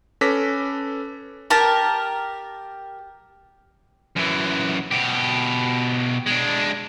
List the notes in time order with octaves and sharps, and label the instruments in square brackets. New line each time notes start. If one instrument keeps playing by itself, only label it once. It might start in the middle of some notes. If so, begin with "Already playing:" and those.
[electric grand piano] C#4 A4 B4 D6 A#6 B6
[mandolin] G4 A#4 A5
[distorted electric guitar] F#2 E3
B2 G4
G#3 D4